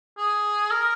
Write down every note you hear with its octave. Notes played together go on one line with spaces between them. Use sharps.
G#4
A#4